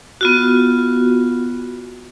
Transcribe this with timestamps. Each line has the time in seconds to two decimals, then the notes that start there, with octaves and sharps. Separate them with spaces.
0.21 B3 F4 F#4